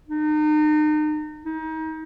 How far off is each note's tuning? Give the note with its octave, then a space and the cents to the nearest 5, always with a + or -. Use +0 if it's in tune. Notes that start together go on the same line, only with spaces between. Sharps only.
D#4 -35
D#4 +30